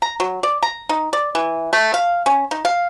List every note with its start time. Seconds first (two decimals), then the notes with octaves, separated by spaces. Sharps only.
0.02 A#5
0.20 F#3
0.43 D5
0.63 A#5
0.89 D#4
1.13 D5
1.35 E3
1.73 A3
1.94 F5
2.26 C#4
2.51 D#4
2.65 F5